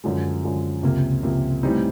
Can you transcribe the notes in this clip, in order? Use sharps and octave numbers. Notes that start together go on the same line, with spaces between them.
F#2 D3 F3 G#3
F#2 D3 F3 G#3
C#2 C3 F3 A#3
C#2 C3 F3 A#3
A2 E3 G3 C4 D#4